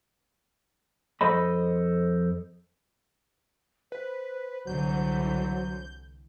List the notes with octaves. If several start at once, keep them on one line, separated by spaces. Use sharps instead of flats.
F2 A4 C5 D#5 B5
B4 C5
C2 D3 E3 F#3 G6